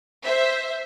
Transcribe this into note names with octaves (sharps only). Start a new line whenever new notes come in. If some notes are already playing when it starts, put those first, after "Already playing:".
C5 E5